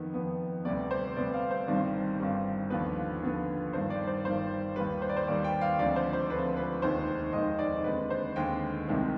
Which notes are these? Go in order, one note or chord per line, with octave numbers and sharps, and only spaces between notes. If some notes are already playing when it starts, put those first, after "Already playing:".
Already playing: F2 D#3 B3
F2 D#3 B3
D2 C3 G3 B3 D5
C5
D2 C3 G3 B3 D5
F5
C5
G1 G2 D#3 G3 C4
G1 G2 D#3 G3 C4
D#2 D3 F3 B3 B4
D#2 D3 F3 B3
G1 G2 D#3 C5
D5
C5
G1 G2 D#3 C5
D#2 D#3 G3 B4
C5
D5
C5
D#2 D#3 G3 D5
G5
F5
D2 D3 F3 G#3 C4 D5
C5
C5
D2 D3 F3 G#3 C4 B4
B4
F1 D#2 D#3 G#3 C5
F1 D#2 D#3 G#3 D#5
D5
D#2 D3 G#3 C4 B4
C5
D#2 D3 G#3 C4 G5
C2 C3 D#3 G#3 C4